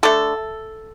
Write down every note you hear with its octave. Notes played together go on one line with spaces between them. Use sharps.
D3 A3 A4